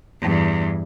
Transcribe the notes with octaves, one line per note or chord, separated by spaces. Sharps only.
E2 G2